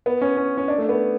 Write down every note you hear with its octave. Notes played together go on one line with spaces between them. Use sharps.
B3
C#4
C#4
C#4
D4
A3
B3